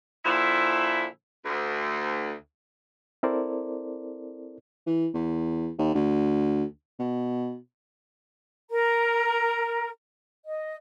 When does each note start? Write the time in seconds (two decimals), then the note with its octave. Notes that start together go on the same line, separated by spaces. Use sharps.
0.24 A#2 D3 F3 E4
1.46 D2
3.23 C4 E4 A4 A#4 C5 D5
4.87 E3
5.14 E2
5.78 D#2
5.94 D2
6.99 B2
8.70 A#4 A#5
10.45 D#5